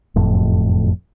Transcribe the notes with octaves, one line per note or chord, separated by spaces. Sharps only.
F#1 F2 A2